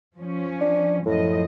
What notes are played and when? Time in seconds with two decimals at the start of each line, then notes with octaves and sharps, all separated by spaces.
0.16 F3 C#4
0.61 D4
1.06 F#2 A2 F3 D#5